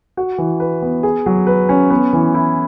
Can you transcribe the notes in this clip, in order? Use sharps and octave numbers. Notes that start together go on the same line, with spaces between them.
F#4
E3
B4
B3
G#4
F#3
B4
C#4
B3
E3
E4